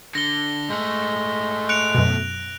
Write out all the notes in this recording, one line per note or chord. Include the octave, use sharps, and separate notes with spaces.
D3 A#6 G7
G#2 G#3 A3
F#6 C#7 D7 F7
F#2 B2